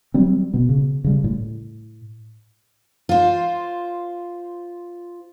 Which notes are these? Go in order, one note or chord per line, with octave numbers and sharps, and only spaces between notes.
F#3 G3 C4
B2 B3
C#3
C#3 G3
A2
F4 C5